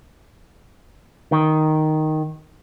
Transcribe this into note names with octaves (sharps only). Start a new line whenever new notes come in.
D#3